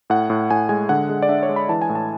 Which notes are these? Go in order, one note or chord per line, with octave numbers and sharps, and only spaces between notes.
A2 F#5
A2
A2 G#5
G#3 G#5
D3 F#5
G#3
D5
D4 E5
C#5
G#3
B5
E3 A5
G#5
A2
A5